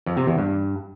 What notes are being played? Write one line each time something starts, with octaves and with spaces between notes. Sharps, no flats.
F2
C3
E2
G2